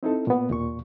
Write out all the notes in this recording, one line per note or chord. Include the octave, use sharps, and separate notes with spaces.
C4 D#4 E4 A4
A#2 B3
D#2 A#2 C#6